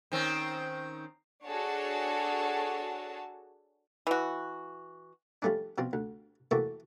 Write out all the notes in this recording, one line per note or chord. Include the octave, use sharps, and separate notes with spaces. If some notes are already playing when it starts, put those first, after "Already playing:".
D#3 C4 C#4
D4 F#4 G#4 A4 C#5 A5
E3 F#4
F3 G3 A3 C#4 D4
B2 F3 C4
D2
E3 A3 A#3 F#4 G4 E5